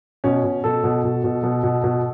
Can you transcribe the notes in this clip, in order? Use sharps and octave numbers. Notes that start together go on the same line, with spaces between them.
B2 C#4
B2
B2 A4
B2
B2
B2
B2
B2
B2